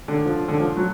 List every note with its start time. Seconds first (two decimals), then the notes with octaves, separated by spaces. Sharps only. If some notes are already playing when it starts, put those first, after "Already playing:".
0.08 D3
0.26 F3
0.48 D3
0.60 F3
0.77 F#3